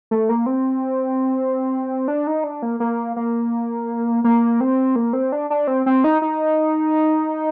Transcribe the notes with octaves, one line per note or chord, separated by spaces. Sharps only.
A3
A#3
C4
D4
D#4
D4
A#3
A#3
A#3
A#3
C4
A#3
C4
D4
D4
C4
C4
D#4
D#4